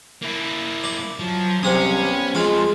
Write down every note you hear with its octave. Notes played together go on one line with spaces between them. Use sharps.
A#3 E4
D5
F3 F#3
C2 C3 C#4 D#6
B3
F2 G#3 F4 F5